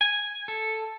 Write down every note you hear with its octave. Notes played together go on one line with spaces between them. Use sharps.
G#5
A4